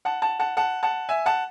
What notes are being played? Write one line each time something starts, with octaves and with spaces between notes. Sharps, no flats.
F#5 A5
F#5 A5
F#5 A5
F#5 A5
F#5 A5
E5 G#5
F#5 A5